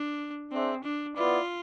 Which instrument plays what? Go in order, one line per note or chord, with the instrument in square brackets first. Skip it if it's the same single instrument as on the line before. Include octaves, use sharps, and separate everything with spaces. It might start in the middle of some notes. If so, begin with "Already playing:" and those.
Already playing: [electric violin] D4
[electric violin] C4 [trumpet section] D4 G#4 C5 E5
[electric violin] D4
[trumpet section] B3 E4 B4 D5 [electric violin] F4